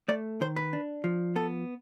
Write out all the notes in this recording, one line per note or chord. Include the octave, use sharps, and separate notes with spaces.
A3 D5
D#3 C5
B4
D4
F3
B3 A4